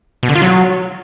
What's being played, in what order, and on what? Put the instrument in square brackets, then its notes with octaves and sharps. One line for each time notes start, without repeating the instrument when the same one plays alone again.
[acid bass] B2
D3
F4
F#3